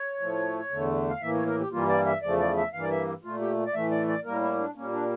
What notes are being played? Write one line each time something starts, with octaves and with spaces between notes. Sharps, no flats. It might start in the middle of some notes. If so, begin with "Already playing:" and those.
Already playing: C#5
A2 F3 A3
E2 D3 A3
F5
A2 E3 A#3 E5
C#5
A#4
G4
G2 E3 G3 A#3 F4
D5
E5
E2 C#3 F3 A3 D5
D5
E5
G2 E3 A#3 F5
D5
E5
A#2 A3 F4
G4
D5
A2 E3 A3 E5
D5
D5
A2 G3 A#3 A#4
E4
D4
A#2 G3 A#3 C#4
D4